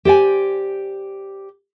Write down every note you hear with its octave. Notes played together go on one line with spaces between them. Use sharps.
G4 C5 D5 G#5